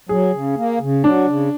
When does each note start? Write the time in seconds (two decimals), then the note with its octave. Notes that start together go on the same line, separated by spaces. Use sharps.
0.09 F#3 G#4
0.33 C#3
0.56 A#3
0.81 C#3
1.04 F#3 D4
1.27 C#3